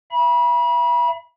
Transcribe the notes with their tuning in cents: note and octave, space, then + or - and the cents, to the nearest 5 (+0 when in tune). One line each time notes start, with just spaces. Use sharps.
E5 +40 B5 -35